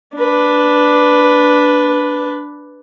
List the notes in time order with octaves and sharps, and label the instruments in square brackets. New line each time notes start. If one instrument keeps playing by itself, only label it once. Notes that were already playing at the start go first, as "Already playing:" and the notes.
[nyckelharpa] D4 B4